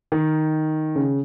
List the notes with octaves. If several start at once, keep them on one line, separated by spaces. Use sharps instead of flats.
D#3
C#3